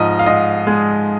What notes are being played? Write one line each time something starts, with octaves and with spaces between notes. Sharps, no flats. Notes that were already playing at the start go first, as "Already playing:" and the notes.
Already playing: G#2 F3 D#5
F5
G#2 D#5
G#3